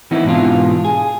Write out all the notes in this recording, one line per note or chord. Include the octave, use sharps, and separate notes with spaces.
E3 B3 C4 D#4 E4
G#2 B2 E3 D4 F4
G#4